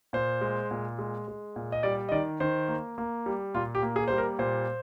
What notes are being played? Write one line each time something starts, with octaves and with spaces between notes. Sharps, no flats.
A#2 C5
G#3
A#2
G#3
G#3
A#2
D#5
G3 D5
D#5
D#3 D5
D#3 C5
A#3
A#3
G3
A#2 F4
G4
A#3
G#4
G3 C5
A#4
A#2 C5